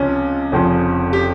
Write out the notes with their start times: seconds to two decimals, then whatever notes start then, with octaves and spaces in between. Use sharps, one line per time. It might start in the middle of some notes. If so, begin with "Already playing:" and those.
Already playing: C#2 C3 F3 C#4
0.52 F1 F2 C#3 F3
1.13 G4